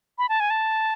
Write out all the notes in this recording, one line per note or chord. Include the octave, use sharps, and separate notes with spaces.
B5
A5
G#5
A5